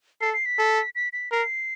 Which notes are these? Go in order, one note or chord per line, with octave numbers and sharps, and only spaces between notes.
A4 C7
C7
B6
A4
B6
B6
A#4 C7